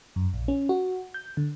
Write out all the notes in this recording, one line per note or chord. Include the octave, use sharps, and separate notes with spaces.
F#2
A#1
C#4
F#4
G6
D3